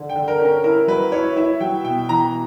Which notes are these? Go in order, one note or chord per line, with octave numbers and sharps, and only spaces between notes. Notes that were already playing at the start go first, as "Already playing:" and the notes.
Already playing: D3
G5
D3
A#4
C#4
A#4
E4 A#4
F#3 B4
E4 C#5
E4 E5
F#3 G5
B2 G5
E3 A#5